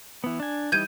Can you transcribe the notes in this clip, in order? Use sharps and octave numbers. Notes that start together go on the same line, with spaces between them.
E3 B3
D4 G#5
E3 G3 D#4 G6 G#6 D#7